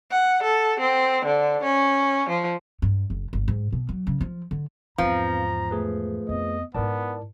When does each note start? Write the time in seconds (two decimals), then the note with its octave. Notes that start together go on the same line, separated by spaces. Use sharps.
0.11 F#5
0.43 A4
0.80 C4
1.25 D3
1.63 C#4
2.29 F3
2.82 G2
3.10 F#1
3.33 G1
3.48 G#2
3.72 B2
3.89 F#3
4.07 C#3
4.21 F3
4.51 D3
4.98 E2 G#2 F3 C4 B4 F5 A#5
5.71 A3 G#4 B4
6.29 F2 B3 D#5
6.74 G#2 B3 E4 A#4 D5 A5